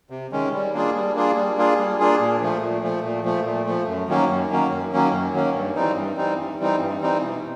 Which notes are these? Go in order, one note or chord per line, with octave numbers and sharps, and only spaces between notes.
C3
D#3 G#3 C#4
G3
A#3 D4 F4 G#4
G3
A#3 D4 F4 G#4
G3
A#3 D4 F4 G#4
G3
A#3 D4 F4 G#4
A#2
F3 A3
A#2
F3 A3
A#2
F3 A3
A#2
F3 A3
F#2
D#3 F#3 A#3 C#4
F#2
D#3 F#3 A#3 C#4
F#2
D#3 F#3 A#3 C#4
F#2
D#3 F#3 A#3 C#4
G2
E3 G3 C4 D#4
G2
E3 G3 C4 D#4
G2
E3 G3 C4 D#4
G2
E3 G3 C4 D#4
B2